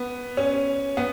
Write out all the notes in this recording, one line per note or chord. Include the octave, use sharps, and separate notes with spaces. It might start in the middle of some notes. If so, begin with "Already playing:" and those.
Already playing: B3
C#4
B3